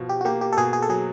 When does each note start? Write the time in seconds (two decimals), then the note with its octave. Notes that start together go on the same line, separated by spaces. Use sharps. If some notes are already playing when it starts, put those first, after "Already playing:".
Already playing: B2 F3
0.09 G4
0.21 F#4
0.25 A#3 G4
0.41 G4
0.52 A4
0.57 B2 G#4
0.73 G#4
0.82 A4
0.89 F#3 G#4